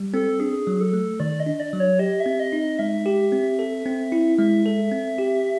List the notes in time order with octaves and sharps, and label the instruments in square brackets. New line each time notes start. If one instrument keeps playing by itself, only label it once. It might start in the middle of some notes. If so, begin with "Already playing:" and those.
Already playing: [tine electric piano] G3
[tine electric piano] C4 [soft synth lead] A4
[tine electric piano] D4 [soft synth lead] G#4
[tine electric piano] F#3
[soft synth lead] A4
[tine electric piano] A3
[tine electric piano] D#3 [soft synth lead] D5
[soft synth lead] D#5
[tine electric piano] D4
[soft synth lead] D5
[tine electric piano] F#3
[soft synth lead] C#5
[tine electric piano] G4 [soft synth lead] D#5
[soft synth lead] E5
[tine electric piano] C4
[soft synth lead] D#5
[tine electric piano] D#4
[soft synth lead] D#5
[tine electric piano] G#3 [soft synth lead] E5
[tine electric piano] G4
C4
A4
C4
E4
[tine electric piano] G#3 [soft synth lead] E5
[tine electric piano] A4
C4
G4